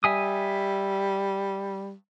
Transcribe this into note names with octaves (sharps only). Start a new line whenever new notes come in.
G3 E5 G#5 D#6